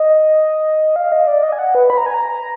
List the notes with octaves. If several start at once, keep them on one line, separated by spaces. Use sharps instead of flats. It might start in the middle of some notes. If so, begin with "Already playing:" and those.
Already playing: D#5
F5
D#5
D5
D#5
G#5
F#5
B4
B5
A#5
G#5
A#5